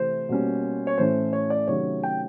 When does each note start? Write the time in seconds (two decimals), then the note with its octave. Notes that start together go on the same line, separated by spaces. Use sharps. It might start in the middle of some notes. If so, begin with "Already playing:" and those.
Already playing: C3 E3 A3 C5
0.29 B2 G3 A#3 C#4
0.87 C#5
0.98 A2 E3 A3 C#4 C5
1.33 C#5
1.50 D5
1.68 C3 D#3 F#3 A3 C#4 C#5
2.03 G5